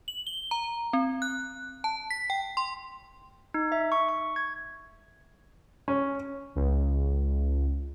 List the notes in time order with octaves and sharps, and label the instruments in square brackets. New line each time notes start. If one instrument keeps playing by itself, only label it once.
[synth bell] F#7
G7
A#5
C4
F#6
A5
B6
G5
C6
[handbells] D#4
E5
C#6
C#6
G#6
[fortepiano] C#4
[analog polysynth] C#2